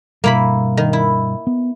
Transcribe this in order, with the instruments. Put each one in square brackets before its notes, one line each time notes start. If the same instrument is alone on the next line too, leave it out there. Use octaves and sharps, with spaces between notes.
[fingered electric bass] G2 B2 G3 [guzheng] A#3 E4 B5
[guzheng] D#3
E4
[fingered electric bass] B3